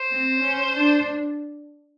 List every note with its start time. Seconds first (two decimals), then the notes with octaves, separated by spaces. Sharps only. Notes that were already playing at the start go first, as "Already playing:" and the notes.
Already playing: C5
0.09 C4
0.41 C#4
0.75 D4